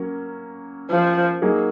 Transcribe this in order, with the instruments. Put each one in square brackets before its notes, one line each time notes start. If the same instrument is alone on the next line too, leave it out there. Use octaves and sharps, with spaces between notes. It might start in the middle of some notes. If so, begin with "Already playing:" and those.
Already playing: [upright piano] F#3 A#3 C#4
[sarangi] F3
[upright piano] F#3 A#3 D#4 G#4